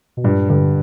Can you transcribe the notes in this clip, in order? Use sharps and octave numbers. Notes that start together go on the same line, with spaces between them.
B2
G2 A#2
G2 D3